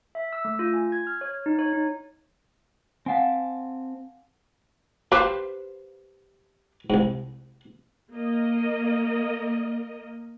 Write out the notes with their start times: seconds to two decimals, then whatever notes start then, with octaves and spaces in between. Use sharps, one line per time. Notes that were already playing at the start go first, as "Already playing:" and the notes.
0.15 E5
0.33 E6
0.45 A3
0.59 F4
0.74 G#5
0.92 G#6
1.07 F6
1.21 C#5
1.46 D#4
1.59 C#5
1.73 D#4
3.06 C4 F5 F#5 G#5 A5
5.12 G4 B4 C5 F5 A5 B5
6.90 C2 G#2
8.14 A#3 A#4 D#5